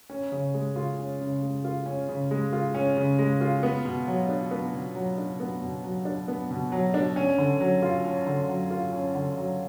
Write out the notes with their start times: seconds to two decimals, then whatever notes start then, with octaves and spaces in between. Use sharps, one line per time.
0.10 C#4
0.32 C#3
0.54 G#3
0.76 F4
0.98 C#4
1.21 C#3
1.42 G#3
1.64 F4
1.86 C#4
2.08 C#3
2.31 G#3
2.53 F4
2.75 C#4
2.97 C#3
3.19 G#3
3.41 F4
3.63 B3
3.85 B2
4.07 F#3
4.29 D4
4.51 B3
4.74 B2
4.95 F#3
5.18 D4
5.40 B3
5.62 B2
5.84 F#3
6.05 D4
6.28 B3
6.51 B2
6.72 F#3
6.94 D4
7.16 C#4
7.38 D3
7.60 F#3
7.82 F4
8.05 C#4
8.26 D3
8.49 F#3
8.71 F4
8.93 C#4
9.15 D3
9.37 F#3